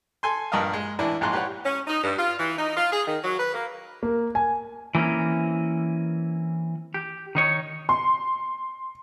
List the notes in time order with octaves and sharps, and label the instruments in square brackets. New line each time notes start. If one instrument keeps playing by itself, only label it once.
[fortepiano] A4 G#5 C6
A#1 G2 A#4 D#5 F5
G#3
A1 E3 D4 E4
A#1 G#2 G#3 A#5 C6 F#6
G4 B4 C#5 F#5
[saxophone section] C#4
D#4
G2
F4
E3
D#4
F4
G#4
D#3
F#3
B4
A#3
[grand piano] A#3
G#5
[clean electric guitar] E3 A#3 C4 C#4
G4
D#3 D#4 C#5
[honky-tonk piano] C6